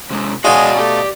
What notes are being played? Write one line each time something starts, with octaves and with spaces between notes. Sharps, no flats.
C3 G#3
B2 G#3 D#4 F4 F#4 C#5 D5 G#5
A3 G4